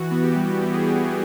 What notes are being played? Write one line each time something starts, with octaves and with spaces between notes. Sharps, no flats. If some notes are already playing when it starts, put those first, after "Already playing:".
Already playing: E3 F#4
B3 F#4
G4
G3
E3 G4
G#4
B3 G4